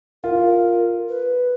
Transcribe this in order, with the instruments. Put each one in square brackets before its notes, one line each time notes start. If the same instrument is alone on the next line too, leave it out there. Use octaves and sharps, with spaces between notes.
[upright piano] F4 [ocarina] A#4
[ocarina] B4